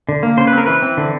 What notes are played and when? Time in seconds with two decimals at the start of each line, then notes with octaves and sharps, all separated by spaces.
0.09 D3
0.23 A#3
0.37 C#3 C5
0.47 B4
0.53 C4 A#4
0.66 E3 B4
0.82 C4
0.97 D3